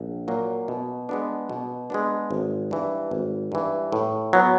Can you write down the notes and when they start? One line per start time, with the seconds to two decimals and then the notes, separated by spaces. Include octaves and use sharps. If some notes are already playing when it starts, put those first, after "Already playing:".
Already playing: A#1
0.28 A#2 F#3 A#3
0.68 B2
1.09 G#3 B3 D4
1.49 B2
1.90 G#3 B3 D4
2.31 G#1
2.71 G2 E3
3.11 G#1
3.52 G2 E3
3.92 A2
4.33 F#3 B3